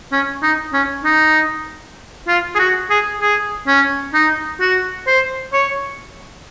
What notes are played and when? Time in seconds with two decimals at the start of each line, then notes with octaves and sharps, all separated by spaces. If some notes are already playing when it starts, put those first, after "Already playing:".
0.12 C#4
0.42 D#4
0.73 C#4
1.04 D#4
2.28 F4
2.55 G#4
2.59 F#4
2.90 G#4
3.21 G#4
3.67 C#4
4.14 D#4
4.60 F#4
5.07 C5
5.53 C#5